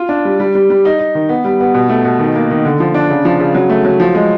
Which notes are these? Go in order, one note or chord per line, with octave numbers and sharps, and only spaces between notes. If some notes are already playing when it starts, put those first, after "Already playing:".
Already playing: F4
D4
G3
G3
G3
G3
D#4
D#4
D#3
B3
G3
B3
B2
A3
B2
D#3
A#3
D#3
D3
F3
D4
C#3
F3
C#3
F#3
A3
F#3
F3
G#3